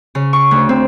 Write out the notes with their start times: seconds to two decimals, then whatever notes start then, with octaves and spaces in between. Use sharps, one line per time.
0.15 C#3
0.33 C#6
0.51 D2
0.69 C4